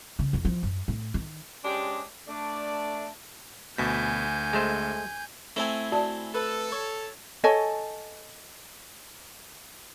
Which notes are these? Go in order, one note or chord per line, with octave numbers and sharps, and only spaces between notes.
C#3
F2
F3
F#2
A2
D#3
G#3 C#4 D4 G4 C5 D5
A3 D4 D5
D2 B2 G#5 G6 B6
G#3 A3 C5
A3 C4 E4 G#5
F#4 D5 A5
A4 B4
C#5
A4 C#5 D#5 G#5